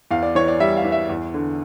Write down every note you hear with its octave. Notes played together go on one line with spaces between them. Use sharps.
E2 F5
D5
E3 C#5
D5
G3 E5
F5
E3
E5
E2
D3